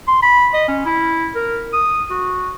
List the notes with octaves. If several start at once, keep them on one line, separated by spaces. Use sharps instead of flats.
C6
B5
D#5
C#4
E4
A#4
D#6
F#4